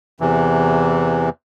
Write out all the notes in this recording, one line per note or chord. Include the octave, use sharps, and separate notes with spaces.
E2 C3 E3